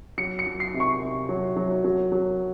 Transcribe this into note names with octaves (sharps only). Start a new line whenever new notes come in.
F#3 C#7
C#7
F#3
C7
C3
C#6
C3
F#3
F#3
F#3
F#3